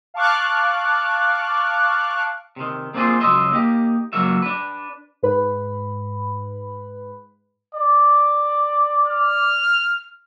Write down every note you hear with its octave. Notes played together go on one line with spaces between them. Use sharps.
F5 A5 C#6 D6 F6 F#6
C3 D#3
A#3 C4 D4 F4 G#4 C5
C#2 F#3 F#4 D#5 E5 C6
A#3 D#4 G4
C#2 F#2 F#3 A#3 F#4 E5
D4 B4
G#2 B4 B5
D5
F6